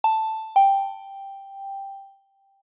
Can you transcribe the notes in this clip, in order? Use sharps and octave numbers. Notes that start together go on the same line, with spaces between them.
A5
G5